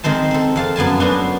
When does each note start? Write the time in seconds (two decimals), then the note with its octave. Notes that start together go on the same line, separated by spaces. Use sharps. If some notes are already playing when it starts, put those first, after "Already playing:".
0.04 D#3 G#3 C4 C5 A5
0.31 C4 A4
0.56 F2 F5 A5
0.76 F#2 B3 G#5 A5
1.00 B3 C#4 D4 F#4 A4 C5